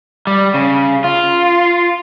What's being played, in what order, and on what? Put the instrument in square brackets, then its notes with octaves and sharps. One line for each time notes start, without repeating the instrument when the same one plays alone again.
[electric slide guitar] G3
C#3
F4